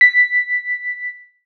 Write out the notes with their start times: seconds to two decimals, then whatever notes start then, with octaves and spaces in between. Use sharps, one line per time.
0.01 B6